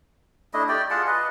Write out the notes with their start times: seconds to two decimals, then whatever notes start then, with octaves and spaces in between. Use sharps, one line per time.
0.54 A3 D4 E4 D#5
0.69 G4 D5 G5
0.90 F4 G#4 F#5 A5
1.07 B4 D#5